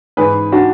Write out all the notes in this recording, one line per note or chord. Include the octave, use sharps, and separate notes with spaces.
G#2 E3 G#4 B4
D4 F#4